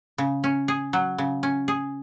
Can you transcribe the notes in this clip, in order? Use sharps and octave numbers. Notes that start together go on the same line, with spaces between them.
C#3
C#4
G#4
F#3
C#3
C#4
G#4